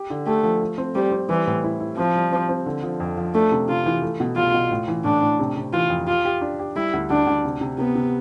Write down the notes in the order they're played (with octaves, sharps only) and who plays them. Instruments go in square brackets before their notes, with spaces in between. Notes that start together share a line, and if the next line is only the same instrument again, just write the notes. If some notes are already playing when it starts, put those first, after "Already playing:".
Already playing: [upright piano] G4
D3
[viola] A3 [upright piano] G4
[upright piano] F3
A3
C4
[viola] G3 [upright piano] C4
[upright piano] C4
[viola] E3 [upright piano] G3
[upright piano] A2
E4
E4
[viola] F3 [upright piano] C4
[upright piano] G3
C4
C4
D3
F3
F2
F3
[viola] A3 [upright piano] D4
[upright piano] C3
[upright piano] C3 [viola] F4
[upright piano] E3
A3
B2
[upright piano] C2 [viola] F4
[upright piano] B2
A2
E3
[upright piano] A2 [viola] D4
[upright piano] A2
C3
C3
[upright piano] E3 [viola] F4
[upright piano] F2
[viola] F4 [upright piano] G4
[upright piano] G4
D4
G4
[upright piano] G3 [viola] E4
[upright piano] D2
[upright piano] D2 [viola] D4
[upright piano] D2
C3
C3
[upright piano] C3 [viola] B3
[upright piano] C3